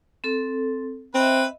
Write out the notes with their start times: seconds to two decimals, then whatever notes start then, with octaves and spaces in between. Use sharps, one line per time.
0.24 C4 A4
1.15 C4 B4 D#5 E5